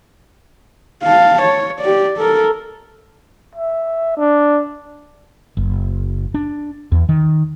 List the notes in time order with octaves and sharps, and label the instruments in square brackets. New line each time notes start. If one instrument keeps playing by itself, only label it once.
[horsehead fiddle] F5 A5
C#5
G4 D5
A4 A#4
[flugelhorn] E5
D4
[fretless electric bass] F#1
D4
E2
D#3